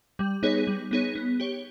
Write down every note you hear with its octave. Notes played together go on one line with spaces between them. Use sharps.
G3
B3 D#4 G#4 C#5
G3
B3 D#4 G#4 C#5
B3
G4 C#5